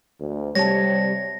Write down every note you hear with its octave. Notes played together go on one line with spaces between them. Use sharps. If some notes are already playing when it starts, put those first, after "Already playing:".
D2
C3 G3 C#5 A5 A#6